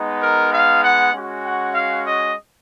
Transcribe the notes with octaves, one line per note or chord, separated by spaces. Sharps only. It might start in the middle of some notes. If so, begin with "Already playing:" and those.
Already playing: G#3 B3 D#4
A#4
F5
F#5
G#3 C#4 F#4
F#5
F5
D#5